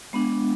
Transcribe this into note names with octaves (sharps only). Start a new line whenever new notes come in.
G#3 B3 D4